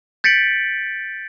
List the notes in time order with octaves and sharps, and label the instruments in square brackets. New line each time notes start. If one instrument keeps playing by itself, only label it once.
[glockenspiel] G6 A6 B6 C#7 D7 F#7